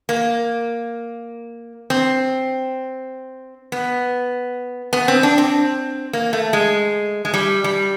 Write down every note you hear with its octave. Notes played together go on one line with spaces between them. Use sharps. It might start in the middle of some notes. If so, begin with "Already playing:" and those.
A#3
C4
B3
B3
C4
D4
C4
A#3
A3
G#3
G#3
G3
G3